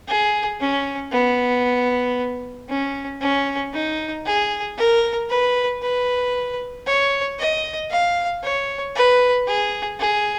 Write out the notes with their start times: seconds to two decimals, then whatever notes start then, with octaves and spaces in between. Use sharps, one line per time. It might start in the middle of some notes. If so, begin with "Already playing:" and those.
0.08 G#4
0.60 C#4
1.12 B3
2.69 C#4
3.21 C#4
3.73 D#4
4.26 G#4
4.78 A#4
5.30 B4
5.82 B4
6.86 C#5
7.39 D#5
7.91 F5
8.43 C#5
8.96 B4
9.48 G#4
10.00 G#4